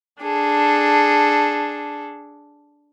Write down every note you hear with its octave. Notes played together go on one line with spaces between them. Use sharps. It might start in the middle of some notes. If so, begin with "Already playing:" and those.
D4 G#4 A4